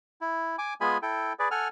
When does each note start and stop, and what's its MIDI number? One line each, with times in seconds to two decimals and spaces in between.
0.21 0.56 64
0.58 0.74 80
0.58 0.74 86
0.81 0.97 56
0.81 0.97 59
0.81 0.97 65
0.81 0.97 68
0.81 0.97 80
0.81 0.97 83
1.02 1.33 64
1.02 1.33 69
1.02 1.33 79
1.39 1.49 68
1.39 1.49 71
1.39 1.49 74
1.51 1.68 69
1.51 1.68 78
1.51 1.68 80
1.51 1.68 89